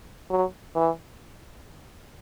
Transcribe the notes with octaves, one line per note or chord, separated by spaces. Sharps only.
F#3
E3